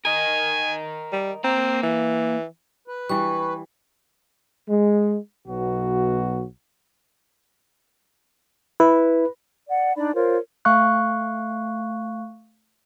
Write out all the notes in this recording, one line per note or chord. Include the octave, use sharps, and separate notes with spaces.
A#4 D#5 G#5
G3
A#3 C4 A#5
E3
B4
E3 G3 C#6
G#3
B1 B2 F#3 F#4
E4 B4
D5 F#5
D4 D#4 D5 B5
F4 A#4 C5 C#5
A3 F5 C#6 F#6